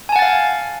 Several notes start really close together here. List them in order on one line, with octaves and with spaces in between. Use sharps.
G#5 A5 F#5 A6 F5